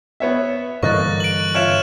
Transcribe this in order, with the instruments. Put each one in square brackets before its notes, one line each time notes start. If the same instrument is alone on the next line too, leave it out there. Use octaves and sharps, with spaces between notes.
[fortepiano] B3 C#5 E5
[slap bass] G2 D3 E3 [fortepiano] A#3 D#5 [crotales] C#6 F#6 A6
[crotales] D7 F#7
[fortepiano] F4 C#5 E5 [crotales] F6 D7 E7